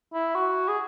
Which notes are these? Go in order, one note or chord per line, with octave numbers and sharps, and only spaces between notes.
E4
F#4
G#4